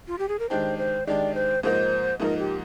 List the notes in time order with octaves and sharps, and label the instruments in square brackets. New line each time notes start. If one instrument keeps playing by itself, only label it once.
[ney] F4
G4
G#4
A#4
[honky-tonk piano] D#3 G#3 D4 G4 [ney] C5
[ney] C5
[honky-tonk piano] D#3 G#3 D4 G4 [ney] D5
[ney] C5
[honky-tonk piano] G#2 F3 A#3 D#4 [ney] C5
[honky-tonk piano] G#2 F3 A#3 D#4 [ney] A#4
[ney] G4